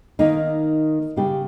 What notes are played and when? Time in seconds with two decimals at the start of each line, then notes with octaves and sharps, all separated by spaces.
0.19 D#3 A#3 D#4
1.16 C#3 G3 A#3 G4